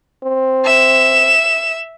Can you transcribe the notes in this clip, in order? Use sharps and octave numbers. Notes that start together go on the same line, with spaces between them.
C4
E5 E7